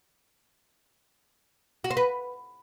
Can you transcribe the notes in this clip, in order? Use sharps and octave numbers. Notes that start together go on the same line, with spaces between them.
F#4
C5
B4